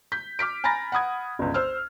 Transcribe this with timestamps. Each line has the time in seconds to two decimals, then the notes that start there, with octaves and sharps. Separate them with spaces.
0.12 G6 B6
0.39 D6 F6 B6 D7
0.64 G#5 A#5 B5 A6 A#6
0.92 F#5 B5 D#6 G#6
1.39 G1 C#2
1.54 C5 E6 F6